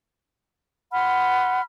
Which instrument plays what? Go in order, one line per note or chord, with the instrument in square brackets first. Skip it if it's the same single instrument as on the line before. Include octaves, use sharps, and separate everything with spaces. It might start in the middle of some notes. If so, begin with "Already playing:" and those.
[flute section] F#5 B5 C6 F6